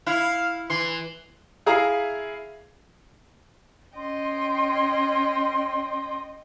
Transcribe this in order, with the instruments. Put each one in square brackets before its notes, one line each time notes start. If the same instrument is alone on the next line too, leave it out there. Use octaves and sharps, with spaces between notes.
[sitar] E4 [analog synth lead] F5
[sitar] E3 [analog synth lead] C6
[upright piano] E4 G#4 E5 F5 A#5 D#6
[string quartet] C#4 D#5 G5 [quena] C6